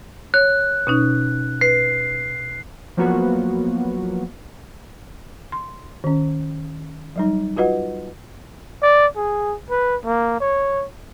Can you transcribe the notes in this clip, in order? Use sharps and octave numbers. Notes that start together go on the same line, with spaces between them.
C#5 F#6
B2 C#4 D#4
B4 C7
F3 F#3 A#3 B3 F#4
C6
D#3 C#4
F#3 G3 D#4
F4 F#4 B4 D#5 F#5
D5
G#4
B4
A#3
C#5